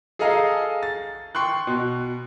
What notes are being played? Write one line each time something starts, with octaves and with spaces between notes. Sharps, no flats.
G#4 A4 D#5 F5 A#5
A6
G5 C6 C#6 F#6
B2